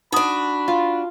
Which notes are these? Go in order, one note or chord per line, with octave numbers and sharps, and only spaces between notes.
D4 D#4 F#4 B5 D#6
F4